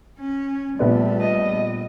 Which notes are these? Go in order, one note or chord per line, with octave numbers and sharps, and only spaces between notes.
C#4
A#1 G3 A3 B3 D5
D#5